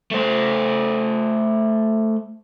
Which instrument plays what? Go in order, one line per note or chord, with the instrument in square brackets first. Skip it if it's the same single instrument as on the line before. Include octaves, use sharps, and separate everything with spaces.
[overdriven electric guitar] A3 C5